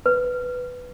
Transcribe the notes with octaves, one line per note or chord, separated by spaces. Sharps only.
B4